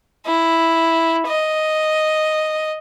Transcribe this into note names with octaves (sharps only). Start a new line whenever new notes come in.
E4
D#5